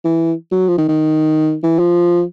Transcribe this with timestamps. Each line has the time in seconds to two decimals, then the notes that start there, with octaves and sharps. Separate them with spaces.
0.04 E3
0.52 F#3
0.68 F3
0.78 D#3
0.88 D#3
1.63 E3
1.79 F3